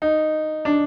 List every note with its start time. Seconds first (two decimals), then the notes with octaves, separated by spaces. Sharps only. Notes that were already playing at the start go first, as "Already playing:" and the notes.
0.02 D#4
0.65 D4